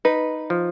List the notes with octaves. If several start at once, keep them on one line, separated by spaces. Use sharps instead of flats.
D#4 B4
F3